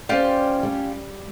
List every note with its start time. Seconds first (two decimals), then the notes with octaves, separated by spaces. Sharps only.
0.09 C#4 F4 G4 C5 D5
0.63 G3